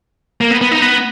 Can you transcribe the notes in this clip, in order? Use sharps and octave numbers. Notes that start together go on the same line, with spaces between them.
A#3
B3
B3
D#4
B3